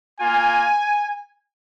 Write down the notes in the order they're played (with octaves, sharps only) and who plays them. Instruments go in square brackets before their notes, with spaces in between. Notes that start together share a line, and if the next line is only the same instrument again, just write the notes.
[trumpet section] A#3 F4 G#5